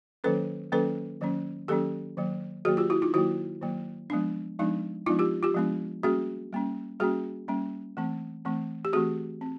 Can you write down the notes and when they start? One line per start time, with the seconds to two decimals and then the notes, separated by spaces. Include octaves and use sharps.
0.24 D#3 F#3 A#3 C#4 A4 B4
0.72 D#3 F#3 A#3 C#4 A4 B4
1.21 D#3 F#3 A#3 C#4
1.68 D#3 F#3 A#3 C#4 G4 A4
2.17 D#3 F#3 A#3
2.65 D#3 F#3 A#3 F#4 G#4
2.77 F4 G4
2.90 E4 F#4
3.02 D#4 F4
3.14 D#3 F#3 A#3 E4 F#4
3.62 D#3 F#3 A#3
4.10 F3 G#3 B3 D4
4.59 F3 G#3 B3 D4 D#4
5.06 F3 G#3 B3 D4 D#4 F4
5.19 F4 G4
5.43 F4 G4
5.55 F3 G#3 B3 D4
6.03 G3 A#3 C#4 F#4 G#4
6.53 G3 A#3 C#4
7.00 G3 A#3 C#4 F#4 G#4
7.48 G3 A#3 C#4
7.97 E3 A3 C4
8.45 E3 A3 C4
8.85 G4
8.93 E3 A3 C4 F#4 G#4
9.41 C4